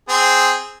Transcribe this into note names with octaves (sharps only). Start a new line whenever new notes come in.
C4 G#4